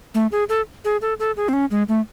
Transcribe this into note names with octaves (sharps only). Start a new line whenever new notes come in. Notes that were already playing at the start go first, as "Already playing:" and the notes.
A3
G#4
A4
G#4
A4
A4
G#4
C4
C#4
G#3
A3